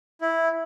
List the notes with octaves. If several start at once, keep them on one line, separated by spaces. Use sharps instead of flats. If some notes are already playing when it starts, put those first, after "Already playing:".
E4